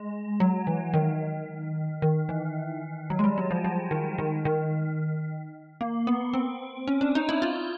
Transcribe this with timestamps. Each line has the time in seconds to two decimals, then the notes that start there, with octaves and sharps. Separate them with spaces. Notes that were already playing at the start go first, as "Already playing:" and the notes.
Already playing: G#3
0.40 F#3
0.67 E3
0.94 D#3
2.02 D#3
2.29 E3
3.10 F#3
3.19 G#3
3.24 G3
3.38 F#3
3.51 F3
3.64 F3
3.91 D#3
4.18 D#3
4.45 D#3
5.81 A#3
6.07 B3
6.34 C4
6.88 C#4
7.01 D4
7.15 D#4
7.29 E4
7.42 F4